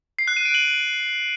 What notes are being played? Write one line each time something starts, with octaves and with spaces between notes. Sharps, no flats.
C7
F#6
D#7
D7
F#7